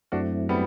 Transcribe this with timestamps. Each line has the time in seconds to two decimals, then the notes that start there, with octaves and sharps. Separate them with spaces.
0.12 F#2 F#3 A3 C4 D4 E4 F#4
0.49 G3 B3